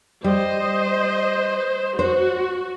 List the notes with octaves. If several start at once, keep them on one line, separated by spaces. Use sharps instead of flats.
G3 C5 D#5
F#4 C5